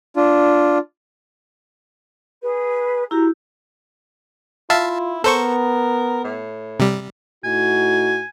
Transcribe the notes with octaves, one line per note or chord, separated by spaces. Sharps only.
D4 F4
G#4 B4
E4 F#4 G4 A#5
E4 F4 E5 F5 A5
B3 A4 A#4 C5 C#6
A2
C3 G3
A2 D#4 F#4 G#5